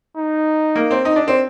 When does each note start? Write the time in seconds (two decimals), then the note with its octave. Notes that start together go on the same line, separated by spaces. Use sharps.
0.17 D#4
0.76 A#3
0.91 C4
1.05 D#4
1.16 D4
1.28 C4